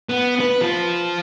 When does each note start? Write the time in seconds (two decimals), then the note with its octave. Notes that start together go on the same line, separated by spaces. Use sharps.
0.09 B3
0.40 B4
0.61 F3 F4